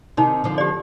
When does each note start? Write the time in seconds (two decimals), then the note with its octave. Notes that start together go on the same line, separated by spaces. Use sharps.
0.17 C3 D#3 D#4
0.44 D3 F3
0.58 G4 D5